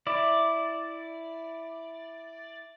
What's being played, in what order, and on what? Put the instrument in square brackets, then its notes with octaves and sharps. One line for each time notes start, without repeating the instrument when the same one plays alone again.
[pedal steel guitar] E4 D5